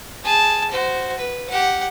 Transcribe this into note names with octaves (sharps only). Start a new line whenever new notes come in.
G#4 A5
F#4 C5
B4
G4 F#5